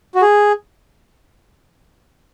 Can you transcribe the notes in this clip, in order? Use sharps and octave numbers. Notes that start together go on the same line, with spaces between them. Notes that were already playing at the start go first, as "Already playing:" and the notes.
F#4
G#4